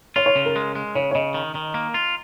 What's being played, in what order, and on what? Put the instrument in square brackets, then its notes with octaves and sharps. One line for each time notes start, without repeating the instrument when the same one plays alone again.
[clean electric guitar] F4 [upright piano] C#5
[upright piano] C#5
[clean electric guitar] C#3
[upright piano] A#4
[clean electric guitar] G#3
G#3
[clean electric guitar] C#3 [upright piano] C#5
[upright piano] C#5
[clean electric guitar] C#3 [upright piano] D#5
[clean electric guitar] D#3
D#3
A#3
F4